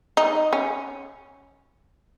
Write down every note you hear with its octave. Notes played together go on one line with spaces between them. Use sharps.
D#4
C#4